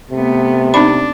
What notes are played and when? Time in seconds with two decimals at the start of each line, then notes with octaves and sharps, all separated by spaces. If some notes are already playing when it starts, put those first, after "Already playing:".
0.11 C3 A3 B3
0.74 C4 D4 D#4 B5